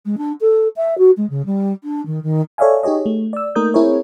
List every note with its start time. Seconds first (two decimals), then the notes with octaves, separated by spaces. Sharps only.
0.05 G#3
0.17 D4
0.40 A4
0.76 E5
0.98 F#4
1.17 G#3
1.30 C#3
1.45 G3
1.83 D4
2.06 D#3
2.23 D#3
2.58 A4 C#5 D5 E5 F5 G#5
2.83 D#4 G4 G#4 C#5 D#5
3.06 A3
3.33 D5 E6
3.55 A3 A#3 D#4 A#4 D#6 G6
3.74 C4 E4 G#4 A#4 C#5